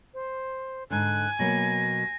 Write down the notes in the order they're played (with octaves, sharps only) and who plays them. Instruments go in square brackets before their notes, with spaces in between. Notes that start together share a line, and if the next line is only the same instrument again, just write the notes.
[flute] C5
[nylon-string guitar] G#2 D3 [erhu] G#5 [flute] F#6
[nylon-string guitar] B2 F#3 A#3 [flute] A#6